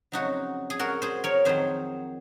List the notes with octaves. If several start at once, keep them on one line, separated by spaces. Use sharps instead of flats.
F2 C#3 F#3 D#4 F#4
G#4
F#4 A#4
G#4 C5
A#4 C#5
F2 D#3 F#3 G#4 C5